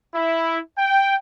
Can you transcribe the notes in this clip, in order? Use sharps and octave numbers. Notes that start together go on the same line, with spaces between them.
E4
G5